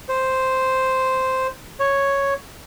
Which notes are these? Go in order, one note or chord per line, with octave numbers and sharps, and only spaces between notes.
C5
C#5